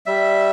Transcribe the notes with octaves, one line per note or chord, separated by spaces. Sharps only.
G3 E5